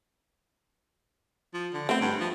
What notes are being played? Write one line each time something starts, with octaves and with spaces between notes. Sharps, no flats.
F3
D3
A3 B3 C4
G2
F3